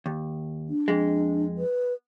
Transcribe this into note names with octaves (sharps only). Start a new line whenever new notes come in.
D#2
D4
F2 G#3
B4